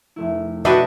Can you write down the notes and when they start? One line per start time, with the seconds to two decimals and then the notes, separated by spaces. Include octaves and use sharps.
0.16 F1 A3 E4
0.65 B1 D4 F#4 G4 B4 D#5 E5